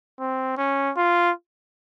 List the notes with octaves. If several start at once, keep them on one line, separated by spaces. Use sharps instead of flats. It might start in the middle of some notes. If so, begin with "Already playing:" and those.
C4
C#4
F4